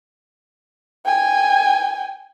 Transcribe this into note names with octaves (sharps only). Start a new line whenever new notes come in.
G5 G#5